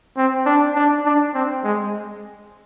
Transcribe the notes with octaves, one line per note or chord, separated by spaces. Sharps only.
C4
D4
D4
D4
C4
G#3